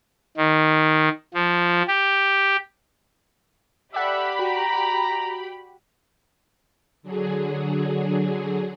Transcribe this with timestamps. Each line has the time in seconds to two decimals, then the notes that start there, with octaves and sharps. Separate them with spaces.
0.37 D#3
1.34 F3
1.88 G4
3.94 G4 A4 D5 E5 F#5 B5
4.39 F#4 A#5
7.03 D3 F#3 G#4